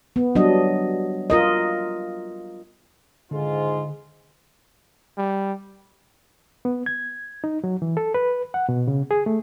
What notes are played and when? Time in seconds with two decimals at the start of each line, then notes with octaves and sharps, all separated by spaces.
0.16 B3
0.35 F#3 G3 D4 D#5
1.30 F4 A#4 D#5
3.31 G#2 D3 G#3 F4
5.18 G3
6.65 B3
6.86 G#6
7.44 D#4
7.64 F#3
7.82 E3
7.97 A4
8.14 B4
8.54 F#5
8.69 B2
8.88 C#3
9.11 G#4
9.26 A3